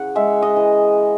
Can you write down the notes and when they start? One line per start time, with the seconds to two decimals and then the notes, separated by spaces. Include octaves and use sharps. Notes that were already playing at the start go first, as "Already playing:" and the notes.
Already playing: C#3 E3 F#5
0.16 G#3 E5
0.42 D#5
0.56 E3